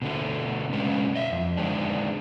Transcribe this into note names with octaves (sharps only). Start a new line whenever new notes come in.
B2 D3 A3
B2 G#3 B3 C#4
D#5 E5
F2
D3 D#3 G#3 D4